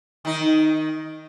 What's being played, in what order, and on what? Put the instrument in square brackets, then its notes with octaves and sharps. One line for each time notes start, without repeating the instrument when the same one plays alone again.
[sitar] D#3 D#4